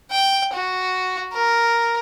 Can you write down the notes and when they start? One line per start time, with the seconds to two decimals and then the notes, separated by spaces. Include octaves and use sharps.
0.11 G5
0.53 F#4
1.33 A#4